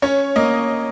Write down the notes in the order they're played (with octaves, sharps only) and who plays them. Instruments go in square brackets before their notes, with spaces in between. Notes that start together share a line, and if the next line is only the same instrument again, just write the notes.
[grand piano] C#4 [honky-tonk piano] C#5
[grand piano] A#3 [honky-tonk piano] D#5